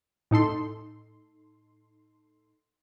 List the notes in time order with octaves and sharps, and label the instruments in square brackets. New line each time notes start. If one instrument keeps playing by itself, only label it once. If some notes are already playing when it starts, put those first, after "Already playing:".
[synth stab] A2 D#4 A4 C6